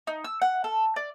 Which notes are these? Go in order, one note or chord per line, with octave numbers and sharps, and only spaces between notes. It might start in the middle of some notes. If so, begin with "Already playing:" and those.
D#4
E6
F#5
A4
D5